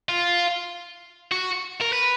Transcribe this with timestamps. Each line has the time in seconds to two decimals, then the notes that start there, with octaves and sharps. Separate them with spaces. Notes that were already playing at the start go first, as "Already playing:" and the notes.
0.09 F4
1.32 F#4
1.81 A#4
1.92 B4